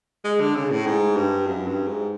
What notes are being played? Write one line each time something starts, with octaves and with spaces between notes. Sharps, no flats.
G#3
D3
C#3
A2
G#2
G2
F#2
G2
G#2